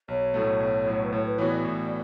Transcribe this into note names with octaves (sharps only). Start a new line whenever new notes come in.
B1 C#5
A2 F#3 A3
B1
A2 F#3 A3
B4
A2 C#5
B4
E3 B3 F#4 C#5
D5
A2